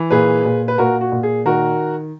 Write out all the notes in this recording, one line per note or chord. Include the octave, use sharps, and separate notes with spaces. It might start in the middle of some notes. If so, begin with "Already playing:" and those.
Already playing: E3
A#2 G#4 B4
A#2
B4
A#2 F#4 A#4
F#4
A#2
G#4
D#3 F#4 A#4